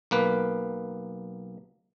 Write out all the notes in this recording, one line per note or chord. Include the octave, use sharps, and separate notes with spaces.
B1 A#3 B4